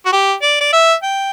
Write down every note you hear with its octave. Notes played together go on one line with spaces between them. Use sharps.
F#4
G4
D5
D5
E5
G5